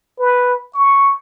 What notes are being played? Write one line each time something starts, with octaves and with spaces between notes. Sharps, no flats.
B4
C#6